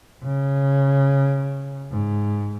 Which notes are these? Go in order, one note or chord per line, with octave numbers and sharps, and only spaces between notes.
C#3
G#2